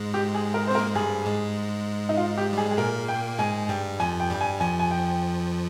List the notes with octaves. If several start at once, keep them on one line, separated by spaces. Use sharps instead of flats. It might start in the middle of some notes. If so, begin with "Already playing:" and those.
Already playing: G#2 G#3
G4
G#4
A#4
C5
C4
A#4
A#3
G#3
G2 G3 G#4
G#2 G#3
D#4
F4
G4
G3 G#4
G#3
G#4
A#2 A#3 A#4
G5
G#2 G#3 G#5
G2 G3 G5
F2 F3 G#5
G5
G2 G3 G5
G#5
F2 F3 G#5
G#5
G5